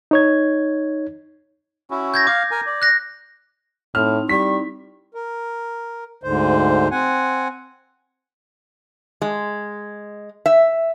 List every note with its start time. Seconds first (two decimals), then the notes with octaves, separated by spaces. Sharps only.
0.11 D#4 C#5 G#6
1.91 C#4 E4 F#4
2.14 G6 G#6 A#6
2.27 F5 D6
2.51 A#4 G#5
2.66 D5
2.82 F#6 A#6
3.95 A2 C4 D#4 E4 F6
4.29 G3 C#6 B6
5.15 A#4
6.23 D2 G#2 D3 C5
6.91 C4 F#5 G#5
9.22 G#3
10.46 E5